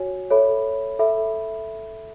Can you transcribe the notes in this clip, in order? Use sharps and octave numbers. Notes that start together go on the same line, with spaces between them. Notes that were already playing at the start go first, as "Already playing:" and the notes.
Already playing: F#4 C#5 G#5
A4 C#5 E5 B5
A4 E5 B5